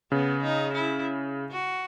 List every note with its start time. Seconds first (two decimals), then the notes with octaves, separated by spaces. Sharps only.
0.12 C#3 B3
0.43 D#4
0.74 E4
1.52 F#4